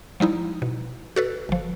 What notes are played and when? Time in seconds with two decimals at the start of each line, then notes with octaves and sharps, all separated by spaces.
0.20 F3 G3 D#4 E4
0.62 B2
1.16 F#4 A4 B4
1.49 G1 F3